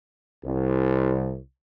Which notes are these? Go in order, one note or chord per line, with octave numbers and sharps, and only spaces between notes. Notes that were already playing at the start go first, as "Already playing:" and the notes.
C2